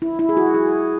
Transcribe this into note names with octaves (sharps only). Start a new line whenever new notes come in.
E4
E4
G#4
F#4
G#4